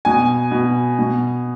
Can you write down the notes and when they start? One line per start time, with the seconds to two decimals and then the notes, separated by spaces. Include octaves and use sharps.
0.05 B2 G#5
0.52 B2
0.99 B2